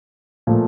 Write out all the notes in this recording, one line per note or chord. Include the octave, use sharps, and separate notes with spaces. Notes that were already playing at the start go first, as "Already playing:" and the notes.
A#2 F3 A3